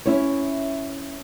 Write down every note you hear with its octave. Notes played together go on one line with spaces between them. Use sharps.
C#4 E4 C#5